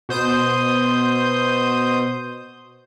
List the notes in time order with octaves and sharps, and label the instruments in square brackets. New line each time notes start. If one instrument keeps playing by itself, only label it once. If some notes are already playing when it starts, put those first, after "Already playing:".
[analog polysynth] B2 C5 D#6 G6